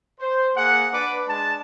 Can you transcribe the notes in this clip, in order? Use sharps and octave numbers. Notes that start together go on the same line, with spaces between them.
C5
A#3 G#4 F#5
D4 B4 D5 D6
G#3 D4 A5